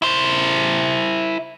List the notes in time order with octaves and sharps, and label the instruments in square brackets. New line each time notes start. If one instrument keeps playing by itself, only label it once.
[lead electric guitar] E4 C5